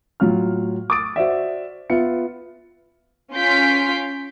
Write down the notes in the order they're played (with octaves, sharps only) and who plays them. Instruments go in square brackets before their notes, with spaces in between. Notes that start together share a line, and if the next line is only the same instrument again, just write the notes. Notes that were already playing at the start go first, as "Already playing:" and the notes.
[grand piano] A2 F#3 F4 F6
D6 D#6 A6 D7
F#4 C5 D5 E5
B3 F4 E5 C#7
[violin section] C#4 F4 C6 G6 B6 D7